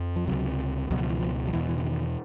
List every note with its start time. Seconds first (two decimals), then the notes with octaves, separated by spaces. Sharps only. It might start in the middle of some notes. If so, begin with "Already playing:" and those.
Already playing: F2
0.16 F3
0.27 C#2 C3 F#3
0.90 C#2 B2 F#3
1.00 F3
1.10 E3
1.19 F3
1.47 F3
1.53 E2 B2 E3
1.68 E3
1.78 D3
1.84 D#3